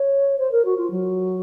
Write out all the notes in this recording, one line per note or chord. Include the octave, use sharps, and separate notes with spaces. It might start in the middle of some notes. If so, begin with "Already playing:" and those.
Already playing: C#5
C5
A#4
F#4
F4
F#3